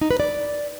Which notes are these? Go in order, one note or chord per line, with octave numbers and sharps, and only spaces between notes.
D#4
B4
D5